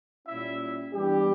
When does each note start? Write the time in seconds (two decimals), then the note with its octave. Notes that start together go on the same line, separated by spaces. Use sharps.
0.26 A#2 G3 C#4 E4 E5
0.93 G2 E3 G3 B3 D4 G4